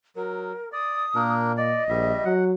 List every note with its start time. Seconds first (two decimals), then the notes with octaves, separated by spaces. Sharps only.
0.16 F#3 A#4
0.72 D5 D#6
1.15 A#2 A#3 D4 A#4
1.57 D5 D#5
1.89 A#1 G3 E5
2.25 F#3 F#5